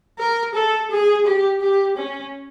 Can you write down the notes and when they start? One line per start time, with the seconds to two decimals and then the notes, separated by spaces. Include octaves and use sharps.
0.18 A#4
0.54 A4
0.91 G#4
1.26 G4
1.61 G4
1.97 C#4